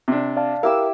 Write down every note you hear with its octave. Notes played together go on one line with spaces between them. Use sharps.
C3 D4
D5 F5 A5
E4 G4 A#4 F5 E6